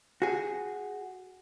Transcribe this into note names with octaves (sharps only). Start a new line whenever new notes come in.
F#4 G#4